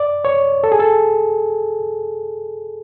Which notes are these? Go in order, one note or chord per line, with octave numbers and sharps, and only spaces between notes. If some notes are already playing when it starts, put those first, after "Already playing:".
Already playing: D5
C#5
A4
G#4
A4